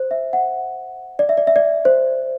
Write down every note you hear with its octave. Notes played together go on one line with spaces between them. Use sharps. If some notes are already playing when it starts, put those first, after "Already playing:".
Already playing: C5
E5
F#5
D5
E5
D5
E5
D5
C5